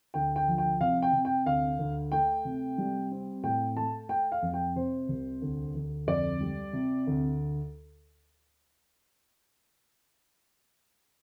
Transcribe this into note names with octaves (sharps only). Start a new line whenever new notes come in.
D2 G5
G5
F3
G5
C3 F5
G5
C3
G5
D2 F5
D2
A3 G5
C3
G3
C4
A2 G5
A3 A5
A3 G5
F5
F2
G5
C3 C5
C2
D2
D2
F2 D5
G3
C3
D2